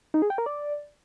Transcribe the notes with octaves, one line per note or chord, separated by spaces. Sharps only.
D#4
G#4
G5
A#4
D5